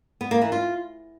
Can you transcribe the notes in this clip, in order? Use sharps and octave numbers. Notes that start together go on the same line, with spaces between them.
B3
A#3
E3
F4